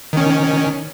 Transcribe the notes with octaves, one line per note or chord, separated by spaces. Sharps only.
D#3 C#4